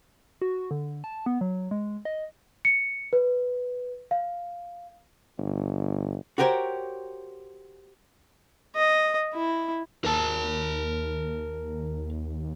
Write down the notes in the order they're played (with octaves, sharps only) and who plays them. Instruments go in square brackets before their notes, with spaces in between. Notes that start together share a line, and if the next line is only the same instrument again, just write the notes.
[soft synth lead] F#4
D3
A5
B3
F#3
G#3
D#5
[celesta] C#7
B4
F5
[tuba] G1
[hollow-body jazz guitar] F#4 G4 A#4 C5 C#5
[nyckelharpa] D#5
E4
[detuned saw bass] D#2 [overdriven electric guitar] A#4 A5